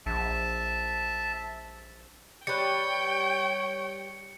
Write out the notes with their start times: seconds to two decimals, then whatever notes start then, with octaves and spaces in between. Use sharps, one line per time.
0.06 A#1 E5 A5
2.47 G3 B4 C#5 G5 C#7